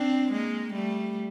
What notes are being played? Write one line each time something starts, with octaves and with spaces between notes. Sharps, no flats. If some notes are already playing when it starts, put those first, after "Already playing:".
Already playing: C4 D4
G#3 A#3
G3 A3